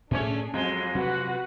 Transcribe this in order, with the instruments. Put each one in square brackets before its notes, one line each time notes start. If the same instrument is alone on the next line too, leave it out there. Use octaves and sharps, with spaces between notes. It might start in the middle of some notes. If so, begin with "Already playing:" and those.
[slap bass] A2 [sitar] A3 C#4 C#5 [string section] D4 G#4
[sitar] F2 G#3 [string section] F#3 [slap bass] C4
[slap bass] C3 F#3 [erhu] F#4 [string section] B4 F#5